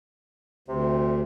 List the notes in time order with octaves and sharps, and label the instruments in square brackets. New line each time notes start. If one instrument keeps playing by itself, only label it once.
[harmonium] D2 [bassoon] C3